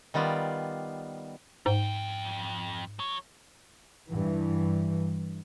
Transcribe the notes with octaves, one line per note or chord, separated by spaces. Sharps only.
D#3 G3 B3 F4 D5
F2 G#2 G5
F#3 C#5
G2 E3